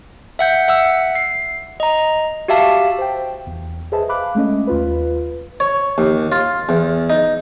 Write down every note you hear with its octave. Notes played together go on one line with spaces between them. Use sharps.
E5 F#5 G6
E5 F#5 E6
C7
D#5 A#5
F#4 G4 E5 F5 A5
C5 G5
E2
G#4 B4 C5 D#5 E5 A5
F5 B5 D6 F#6
G#3 A3 C#4 D#5
D#2 F4 B4
C#5
D#2
F4
E2
D#4